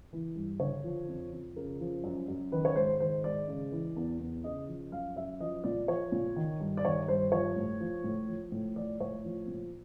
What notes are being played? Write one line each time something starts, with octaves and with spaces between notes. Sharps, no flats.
E3
G2
D3 C#5
F3
F2
F2
C#3 A#4
F3
F#2
F#2
D#3 B4
C#5
G#2 C5
D#3 C5
G#2 D5
C#3
E3
E2
E2
C#3 D#5
F3
F#2 F5
F#2 E5
F3 D#5
A#2 D5
F3 C#5
A#2
D#3
G2
D5
D#3 C#5
G2 C5
F3 C#5
A2
F3
A2
F3
A2
F3 D5
A2 C#5
F3
A#2